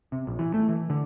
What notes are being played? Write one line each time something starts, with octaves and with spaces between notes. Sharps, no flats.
C3
A#1
E3
A3
E3
D3